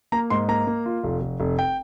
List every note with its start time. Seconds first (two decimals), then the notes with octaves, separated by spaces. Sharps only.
0.12 A#3 A#5
0.30 G#2 C6
0.48 A#3 A#5
0.67 A#3
0.86 F4
1.04 F1
1.21 F1
1.40 F1
1.59 G5